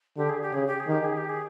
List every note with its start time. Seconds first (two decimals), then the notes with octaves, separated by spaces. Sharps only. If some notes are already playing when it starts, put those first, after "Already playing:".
0.17 D3 G4
0.29 G#4
0.42 G4
0.52 C#3 G#4
0.67 G4
0.79 G#4
0.87 D#3 G4
1.04 G#4
1.17 G4
1.29 G#4